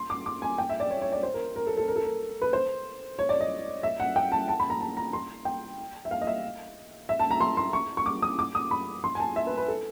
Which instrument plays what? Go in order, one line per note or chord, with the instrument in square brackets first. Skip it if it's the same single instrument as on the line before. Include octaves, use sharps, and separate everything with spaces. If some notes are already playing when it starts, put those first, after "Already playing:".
Already playing: [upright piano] C6
D6
D6
G#5
G5
E5
D5
C#5
C#5
D5
C5
A#4
A#4
A4
A4
A#4
A4
A#4
B4
C5
C#5
D5
D#5
E5
F#5
G5
A5
A5
B5
A#5
A5
A#5
C6
G5
E5
F5
D#5
E5
E5
A5
A#5
C6
C6
C#6
C#6
D6
D#6
D6
D#6
B5
C6
G#5
A5
E5
B4
B4
A4